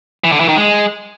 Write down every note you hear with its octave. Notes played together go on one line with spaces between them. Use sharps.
E3
D3
E3
D#3
G#3